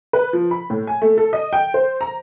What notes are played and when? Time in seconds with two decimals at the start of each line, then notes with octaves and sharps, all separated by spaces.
0.13 B4
0.33 F3
0.51 B5
0.70 A2
0.87 G#5
1.02 A3
1.18 A4
1.33 D#5
1.53 G5
1.74 C5
2.01 A#5